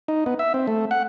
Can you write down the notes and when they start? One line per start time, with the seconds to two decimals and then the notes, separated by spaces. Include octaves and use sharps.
0.08 D#4
0.26 B3
0.39 E5
0.54 C4
0.68 A3
0.91 F#5